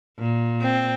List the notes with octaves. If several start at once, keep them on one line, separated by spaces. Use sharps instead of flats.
A#2
C4